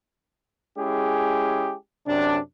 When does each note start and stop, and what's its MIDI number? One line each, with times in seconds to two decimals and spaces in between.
0.78 1.74 56
0.78 1.74 61
0.78 1.74 64
0.78 1.74 67
0.78 1.74 68
2.07 2.38 42
2.07 2.38 48
2.07 2.38 62